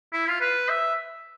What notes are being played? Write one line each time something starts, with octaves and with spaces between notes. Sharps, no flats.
E4
F4
B4
E5